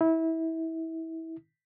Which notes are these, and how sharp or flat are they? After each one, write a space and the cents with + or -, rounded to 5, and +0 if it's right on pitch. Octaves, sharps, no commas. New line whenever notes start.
E4 -25